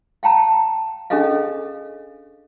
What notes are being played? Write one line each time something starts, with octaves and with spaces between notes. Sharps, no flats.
F5 G5 A5 A#5
C#4 D4 G#4 A4 D#5 F5